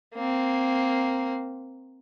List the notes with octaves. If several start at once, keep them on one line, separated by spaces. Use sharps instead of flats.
A#3 C4